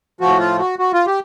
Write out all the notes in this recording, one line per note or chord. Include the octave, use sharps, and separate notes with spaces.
A2 F3 F#4
F4
F#4
F#4
F4
G4